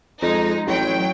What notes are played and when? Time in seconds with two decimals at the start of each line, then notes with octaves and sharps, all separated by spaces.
0.22 F2 G#3 D#4
0.66 A1 F#3 G5